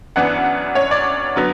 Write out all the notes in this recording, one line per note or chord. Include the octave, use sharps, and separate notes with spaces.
F#2 E3 B3 D4 F#5
C#5
D5
D3 F#3 B3